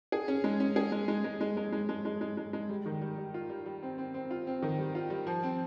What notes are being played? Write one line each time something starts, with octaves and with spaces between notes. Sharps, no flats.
G#4
C#4
G#3
C#4
G#4
G#3
G#3
G#3
G#3
G#3
G#3
G#3
G#3
G#3
G#3
G#3
G3
D#3
G3
G3
F4
G3
G3
C4
C4
C4
F4
C4
D#3
G3
F4
G3
F3
C4